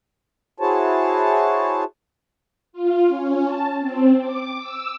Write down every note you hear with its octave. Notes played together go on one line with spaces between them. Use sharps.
E4 F#4 G#4 C5 C#5 A5
F4
C#4
A5
C4
D6
E6